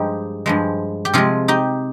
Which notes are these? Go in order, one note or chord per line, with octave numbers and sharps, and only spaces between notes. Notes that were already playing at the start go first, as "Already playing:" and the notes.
Already playing: G2 F3 G#3 D#4 G4
G2 F3 G#3
G4
C3 F3 G#3 F4 G#4
D#4 G4